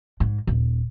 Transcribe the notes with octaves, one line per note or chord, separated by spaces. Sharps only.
G#2
D#1